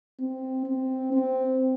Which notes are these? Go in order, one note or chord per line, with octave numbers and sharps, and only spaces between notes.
C4
C4
C4